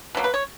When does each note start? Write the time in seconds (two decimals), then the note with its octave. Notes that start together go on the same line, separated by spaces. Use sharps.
0.15 B2 F#3 A#3
0.24 B4
0.34 C#5